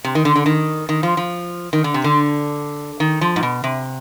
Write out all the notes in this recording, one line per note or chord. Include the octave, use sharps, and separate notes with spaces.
C3
D#3
D3
D3
D#3
D#3
F3
F3
D#3
D3
C3
D3
D#3
F3
G#2
B2
C3